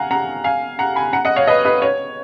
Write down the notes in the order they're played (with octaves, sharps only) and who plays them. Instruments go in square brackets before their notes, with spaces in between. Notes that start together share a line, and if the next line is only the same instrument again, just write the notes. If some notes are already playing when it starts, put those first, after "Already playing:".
Already playing: [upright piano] F5 F#5 G#5 A#5
F#5 A#5
F5 G#5
F#5 A#5
G#5 B5
F#5 A#5
D#5 F#5
C#5 F5
B4 D#5
B4 D#5
C#5